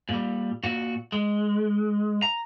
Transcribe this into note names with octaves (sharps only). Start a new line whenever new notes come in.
A#2 G3
A#2 F#4
G#3
A#5